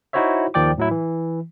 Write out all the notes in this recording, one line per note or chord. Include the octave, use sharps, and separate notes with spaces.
D#4 E4 F#4 C5 C#5 E5
D#2 D#3 F3 D5 G5 D6
A2 F#3 E4
E3